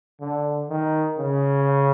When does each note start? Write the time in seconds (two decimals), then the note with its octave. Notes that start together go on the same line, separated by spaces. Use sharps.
0.21 D3
0.70 D#3
1.19 C#3